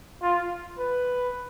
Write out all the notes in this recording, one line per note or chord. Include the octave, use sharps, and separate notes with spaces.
F4
B4